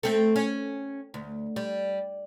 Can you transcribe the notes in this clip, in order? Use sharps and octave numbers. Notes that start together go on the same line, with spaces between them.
A3 C4 A4
C#4
D2
G3